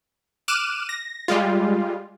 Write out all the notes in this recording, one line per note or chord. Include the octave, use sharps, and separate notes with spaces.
D6 F6 F#6 D#7 E7
A#6
G3 G#3 F4